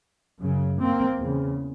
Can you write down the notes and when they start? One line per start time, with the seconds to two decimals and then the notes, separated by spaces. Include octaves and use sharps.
0.42 F#2 C#3
0.81 A#3 C4
1.20 E2 C#3